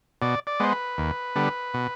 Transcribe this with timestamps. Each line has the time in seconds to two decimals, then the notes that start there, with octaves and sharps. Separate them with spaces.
0.22 B2 D5
0.47 D5
0.60 G#3 B3 C5
0.72 B4
0.98 D#2
1.36 D3 G3 B3
1.74 B2